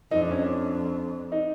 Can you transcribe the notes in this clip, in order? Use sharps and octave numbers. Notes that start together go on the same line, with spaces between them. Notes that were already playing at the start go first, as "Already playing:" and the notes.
F2 D#4
D4
C#4
D4
D#4